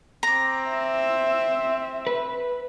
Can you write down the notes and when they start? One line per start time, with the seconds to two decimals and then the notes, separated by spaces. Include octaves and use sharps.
0.23 C4 A#5 D6
0.70 E5
2.07 B4